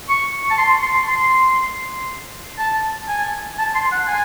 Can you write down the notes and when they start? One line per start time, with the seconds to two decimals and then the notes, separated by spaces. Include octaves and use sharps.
0.09 C#6
0.51 A5
0.58 C6
0.83 C6
1.08 C6
2.59 A5
3.08 G#5
3.59 A5
3.75 C6
3.92 F#5
4.08 G#5